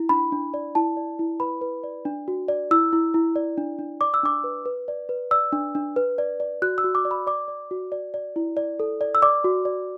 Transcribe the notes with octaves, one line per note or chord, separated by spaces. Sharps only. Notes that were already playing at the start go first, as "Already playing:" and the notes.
Already playing: E4
D4 B5
D4
D5
E4 A5
D5
E4
B4 B5
B4
D5
D4
F#4
D5
E4 E6
E4
E4
D5
D4
D4
D5 D6
E6
D4 D6
B4
B4
D5
B4
D5 E6
D4
D4
B4
D5
D5
F#4 F#6
E6
F#4
D6
D5
B5
D5 D6
D5
F#4
D5
D5
E4
D5
A4
D5
E6
D5 D6
F#4
D5